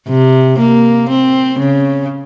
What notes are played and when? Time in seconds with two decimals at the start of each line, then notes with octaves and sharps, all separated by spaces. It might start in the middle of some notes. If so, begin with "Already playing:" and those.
0.09 C3
0.59 A#3
1.09 C4
1.59 C#3